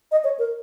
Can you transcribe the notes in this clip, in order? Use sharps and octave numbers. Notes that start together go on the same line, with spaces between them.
D#5
C#5
A#4